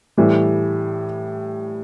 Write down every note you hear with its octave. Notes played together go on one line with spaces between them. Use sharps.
A2 E3 G3